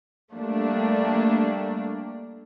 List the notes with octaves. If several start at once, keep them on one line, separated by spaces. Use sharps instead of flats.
G3 A3 A#3 D4